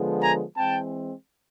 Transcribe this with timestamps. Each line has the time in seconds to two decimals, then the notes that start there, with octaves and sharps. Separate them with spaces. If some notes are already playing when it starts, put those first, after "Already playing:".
Already playing: D3 F3 G#3 B3
0.22 G#5 A#5
0.57 E3 G#3 C4 G5 A5